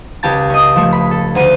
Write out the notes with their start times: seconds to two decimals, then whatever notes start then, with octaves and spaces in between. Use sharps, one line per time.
0.23 C#2 G4 A5 A6
0.50 C#4 D#5
0.76 F3 A3
0.93 B5
1.11 A4
1.35 D2 D3 D#7